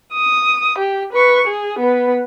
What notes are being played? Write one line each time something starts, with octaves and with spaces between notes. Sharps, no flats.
D#6
G4
B4 C#6
G#4
B3 B4